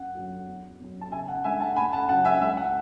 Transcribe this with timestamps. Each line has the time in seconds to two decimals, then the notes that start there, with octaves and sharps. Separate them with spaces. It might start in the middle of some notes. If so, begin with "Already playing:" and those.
Already playing: F#2 F#5
0.15 D3 F#3
0.47 E2
0.80 B2 F#3 C#4
1.01 A5
1.12 C#3 E5 G#5
1.28 F#5
1.44 G#3 D4 E5 G#5
1.60 F#5 A5
1.76 D2 G#5 B5
1.93 F#5 A5
2.09 C#3 F#3 C#4 F#5 A5
2.25 E5 G#5
2.41 C#2 E5
2.57 F#5